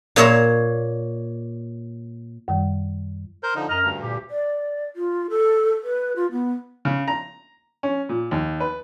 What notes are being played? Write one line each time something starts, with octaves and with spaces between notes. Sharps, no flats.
A#2 A#3 C#5 E5 A#5
F#2 D#3 G3
A#4 C5 G6
D3 F3 D#4
F#2 D#5 A#5 F6
D2 G2
A#2 G4
D5
F4
A4
B4
F4
B3
C#3
A#5
C#4
A#2
D#2
B4